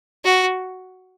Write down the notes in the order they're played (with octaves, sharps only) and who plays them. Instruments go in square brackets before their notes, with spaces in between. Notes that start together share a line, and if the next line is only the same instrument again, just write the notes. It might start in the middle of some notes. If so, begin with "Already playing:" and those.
[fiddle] F#4